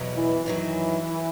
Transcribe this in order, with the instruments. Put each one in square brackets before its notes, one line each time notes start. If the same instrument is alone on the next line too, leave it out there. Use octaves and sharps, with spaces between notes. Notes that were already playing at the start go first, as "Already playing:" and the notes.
Already playing: [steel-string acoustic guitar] E2 B2 F#3
[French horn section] E3
[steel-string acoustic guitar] F#2 D#3 F#3 [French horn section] E3